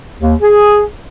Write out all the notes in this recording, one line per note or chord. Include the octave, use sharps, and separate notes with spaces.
D#2
G#4